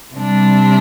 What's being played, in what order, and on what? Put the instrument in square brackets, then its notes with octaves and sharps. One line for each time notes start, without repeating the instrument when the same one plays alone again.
[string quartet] C3 G3 D4